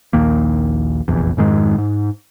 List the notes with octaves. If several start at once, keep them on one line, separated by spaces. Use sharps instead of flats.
A#1 D#2 D#3 A#3
F1 A#1 E2
F2 G#2 D#3 G#3
G#2